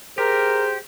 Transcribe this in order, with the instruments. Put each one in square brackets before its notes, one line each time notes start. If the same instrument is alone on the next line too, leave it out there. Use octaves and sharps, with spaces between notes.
[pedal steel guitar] G4 [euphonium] G#4 [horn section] A#4 [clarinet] C5